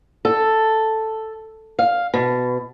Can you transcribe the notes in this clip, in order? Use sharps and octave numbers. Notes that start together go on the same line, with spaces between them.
A4
F5
B2